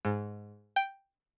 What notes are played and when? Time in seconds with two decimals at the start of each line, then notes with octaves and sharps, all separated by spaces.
0.05 G#2
0.76 G5